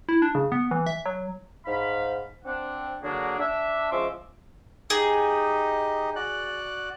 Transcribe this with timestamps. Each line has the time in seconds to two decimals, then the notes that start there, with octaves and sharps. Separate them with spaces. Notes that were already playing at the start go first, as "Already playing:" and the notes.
0.09 E4
0.22 D4
0.35 C#3
0.52 B3
0.71 E3
0.87 E5
1.06 F#3
1.66 G#2 F5 B5
2.45 C4 D4 F#5
3.02 D3 F#3 A#3 D4 F#4 G#4
3.39 D4 E5
3.91 F3 G#3 C#4 E5 C6 D6
4.90 D#4 G4 G#4 D#5
6.16 F#4 D5 F#6